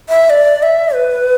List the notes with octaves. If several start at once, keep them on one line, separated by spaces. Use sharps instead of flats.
E5
D5
E5
B4